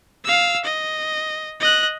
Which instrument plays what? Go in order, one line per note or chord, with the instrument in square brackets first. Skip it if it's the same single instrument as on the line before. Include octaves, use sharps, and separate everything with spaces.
[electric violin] F5 E6
D#5
D#5 F#6